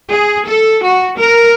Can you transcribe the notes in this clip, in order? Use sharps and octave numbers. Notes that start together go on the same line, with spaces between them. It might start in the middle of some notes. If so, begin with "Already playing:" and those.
G#4
A4
F#4
A#4